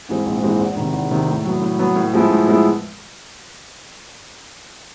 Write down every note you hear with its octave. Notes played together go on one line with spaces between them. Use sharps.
G#2 E3 G#3 C4
A#1
G#2 E3 G#3 C4
E2
C3 D#3
E2
C3 D#3
A2
F#3 B3
A2
F#3 B3
A2
F3 G#3 B3 E4
A2
F3 G#3 B3 E4